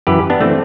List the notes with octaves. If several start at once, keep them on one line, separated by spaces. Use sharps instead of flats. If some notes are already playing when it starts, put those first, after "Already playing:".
F#2 E3 G4 B4
B3 D4
E3 A3 C4